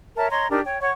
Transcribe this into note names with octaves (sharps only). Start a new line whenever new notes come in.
A#4 C#5 E5 A5
C#5 D#5 A#5 C6
D4 D#4 G4 A#4
C#5 G5
C#5 F#5 C#6